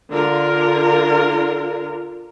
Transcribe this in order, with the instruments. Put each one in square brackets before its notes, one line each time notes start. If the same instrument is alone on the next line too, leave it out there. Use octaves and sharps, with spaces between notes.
[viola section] D3 F4 A#4